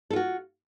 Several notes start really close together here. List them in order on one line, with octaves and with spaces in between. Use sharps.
A4 F4 F#4